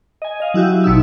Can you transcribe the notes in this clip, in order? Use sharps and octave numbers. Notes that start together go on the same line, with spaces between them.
D#5 G#5
D#5 F5
F#3 E4 F#4 G4
A1 B2 D#4 E6